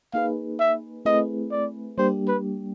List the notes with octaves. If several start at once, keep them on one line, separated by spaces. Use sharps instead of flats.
A#3 D#4 G#4 B4 F5
E5
A3 C4 E4 G#4 B4 D#5
D5
G3 A#3 D4 G4 C5
B4